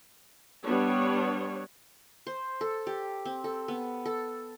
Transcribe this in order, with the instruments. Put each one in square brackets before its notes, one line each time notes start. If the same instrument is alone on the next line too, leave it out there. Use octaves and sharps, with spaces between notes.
[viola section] G3 B3 D4 C#5
[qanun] C5
A4
G4
C4
A4
B3
A4